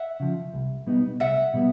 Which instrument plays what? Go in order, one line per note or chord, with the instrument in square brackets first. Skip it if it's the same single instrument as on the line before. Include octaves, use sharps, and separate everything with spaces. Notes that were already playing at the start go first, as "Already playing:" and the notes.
Already playing: [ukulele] E5 F#5
[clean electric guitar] C#3 F3
C2
B2 G3 B3 D#4
[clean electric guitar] C2 [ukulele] E5 F#5
[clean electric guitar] B2 G3 B3